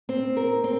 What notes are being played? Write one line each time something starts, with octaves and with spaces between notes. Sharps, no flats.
C4
A#4
C4